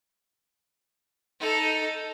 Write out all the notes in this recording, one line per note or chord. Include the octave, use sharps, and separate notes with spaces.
D#4 A4